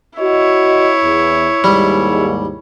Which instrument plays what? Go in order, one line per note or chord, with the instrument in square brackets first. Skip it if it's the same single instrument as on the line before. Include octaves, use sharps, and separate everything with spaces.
[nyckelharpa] E4 C#5 [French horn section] F#4 D#5
[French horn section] E2
[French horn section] D#2 G#2 [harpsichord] G3